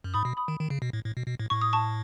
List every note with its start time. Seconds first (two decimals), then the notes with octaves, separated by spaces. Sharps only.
0.04 F#2
0.14 G#2 B5 D#6
0.25 B2
0.37 B5 D#6
0.48 D#3
0.60 D#3
0.70 C#3
0.82 B2
0.93 A2
1.04 A2
1.17 B2
1.27 B2
1.40 A2
1.50 A2 C#6
1.61 D#6
1.73 A5 C#6